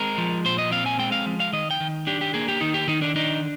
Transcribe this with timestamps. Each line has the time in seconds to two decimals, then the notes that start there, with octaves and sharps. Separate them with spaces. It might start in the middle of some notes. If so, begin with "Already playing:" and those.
Already playing: G#3 C4 A#4
0.18 F3
0.45 A#2 C5
0.58 D#5
0.71 C4 F5
0.86 G#5
0.99 G#3 G5
1.12 F5
1.26 F3
1.40 F5
1.53 D#3 D#5
1.71 G5
1.80 D#3
2.07 D4 G4
2.21 G4
2.34 A#3 G#4
2.48 G4
2.61 D#3 D#4
2.74 G4
2.88 D#3 D#4
3.02 D4
3.16 D4 D#4